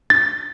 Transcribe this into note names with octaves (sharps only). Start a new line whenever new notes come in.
A6